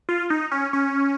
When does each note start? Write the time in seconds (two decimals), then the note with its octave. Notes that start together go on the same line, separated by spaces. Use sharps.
0.09 F4
0.30 D#4
0.52 C#4
0.73 C#4